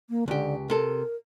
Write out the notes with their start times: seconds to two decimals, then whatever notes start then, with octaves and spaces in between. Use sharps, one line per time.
0.10 A#3
0.28 C#2 D3 G4
0.70 C3 A4 A#4